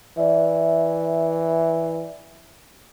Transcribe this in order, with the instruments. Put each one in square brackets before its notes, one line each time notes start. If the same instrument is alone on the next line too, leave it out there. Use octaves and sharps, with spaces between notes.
[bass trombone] E3 [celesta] D5 E5